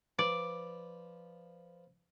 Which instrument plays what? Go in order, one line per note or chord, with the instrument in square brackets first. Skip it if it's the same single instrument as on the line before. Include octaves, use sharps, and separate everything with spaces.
[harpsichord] F3 B4 [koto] D5